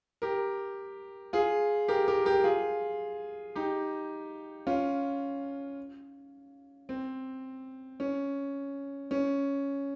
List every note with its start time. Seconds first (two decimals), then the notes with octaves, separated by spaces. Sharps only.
0.22 G4 A#4
1.33 F4 G#4
1.88 G4 A#4
2.08 G4 A#4
2.26 G4 A#4
2.44 F4 G#4
3.55 D#4 G4
4.67 C#4 F4
6.89 C4
8.00 C#4
9.11 C#4